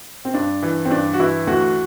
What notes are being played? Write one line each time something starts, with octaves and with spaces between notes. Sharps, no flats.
C4
G2 D4
E3
C4
G2 D4
F#4
E3 E4
D2 F#4